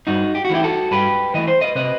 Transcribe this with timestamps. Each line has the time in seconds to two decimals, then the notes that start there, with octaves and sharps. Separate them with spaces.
0.07 G2 D#4 F#4
0.35 G4
0.45 F#4
0.50 E3 A3 E4 G4
0.63 F#4 A4
0.91 G2 G4 B4
1.34 E3 A3 D#5
1.48 C5
1.61 B4 D#5
1.75 C3 B4 D#5